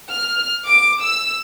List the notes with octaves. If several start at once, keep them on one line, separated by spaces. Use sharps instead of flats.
F6
D6
E6